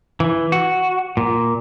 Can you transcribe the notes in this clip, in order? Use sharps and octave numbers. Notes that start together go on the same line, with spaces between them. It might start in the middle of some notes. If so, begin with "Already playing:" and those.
E3
F#4
A#2